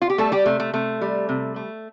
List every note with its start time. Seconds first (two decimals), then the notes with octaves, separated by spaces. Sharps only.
0.02 F4
0.10 G4
0.18 G3 A3 A4
0.32 G3 G4
0.46 C3 A3
0.60 A3
0.73 C3 A3
1.01 G3
1.29 C3
1.56 A3